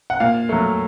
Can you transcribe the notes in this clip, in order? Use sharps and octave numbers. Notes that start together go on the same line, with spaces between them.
F#5
A#2 F5
F#3 A3